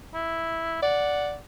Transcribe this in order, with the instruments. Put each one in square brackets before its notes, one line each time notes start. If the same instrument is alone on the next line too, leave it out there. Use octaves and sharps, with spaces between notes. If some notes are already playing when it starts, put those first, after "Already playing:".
[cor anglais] E4
[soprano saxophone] D5 [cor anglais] F#5